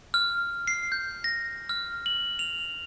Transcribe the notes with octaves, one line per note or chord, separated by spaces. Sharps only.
F6
C7
G6
A#6
F6
F#7
F7